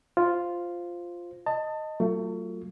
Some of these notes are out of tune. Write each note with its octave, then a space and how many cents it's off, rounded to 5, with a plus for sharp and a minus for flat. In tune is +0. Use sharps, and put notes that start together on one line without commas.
F4 +0 C5 +0
D#5 +0 A5 +25
F#3 +25 A3 +35 F4 +5